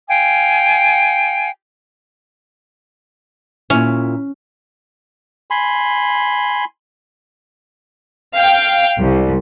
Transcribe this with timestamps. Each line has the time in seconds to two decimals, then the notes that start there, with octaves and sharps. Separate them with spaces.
0.08 F5 G5 G#5
3.70 A#2 C#4 E4
5.50 G#5 B5 C6
8.34 F5 G5
8.99 C2